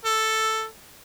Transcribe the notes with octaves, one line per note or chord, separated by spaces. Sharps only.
A4